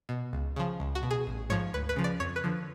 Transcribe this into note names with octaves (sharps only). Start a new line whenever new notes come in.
B2
C#2
C#3 F3
C#2
F#4
B2
G#4
A1
G#2 F3 C#5
D2 B4
B4
C#3 F3
D5
F2 C#5
B4
D3 F3